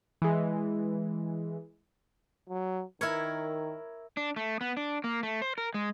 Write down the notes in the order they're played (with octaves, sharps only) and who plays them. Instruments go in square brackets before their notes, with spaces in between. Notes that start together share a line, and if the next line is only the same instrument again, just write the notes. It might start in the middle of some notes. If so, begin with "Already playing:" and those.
[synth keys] E3 G#3
[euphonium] F#3
[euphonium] D#3 [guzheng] E4 A#4 C#5
[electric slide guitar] D4
A3
B3
D4
A#3
A3
C5
A#4
G#3